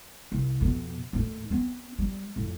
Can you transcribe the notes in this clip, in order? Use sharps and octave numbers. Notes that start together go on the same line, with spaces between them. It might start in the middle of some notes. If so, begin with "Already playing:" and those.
C2
F2 B2
D#2 A2
B3 C4
G3
F2 A2